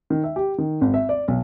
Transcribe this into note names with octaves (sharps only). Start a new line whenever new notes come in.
D#3
E5
G4
D#3
G#1
E5
D5
B1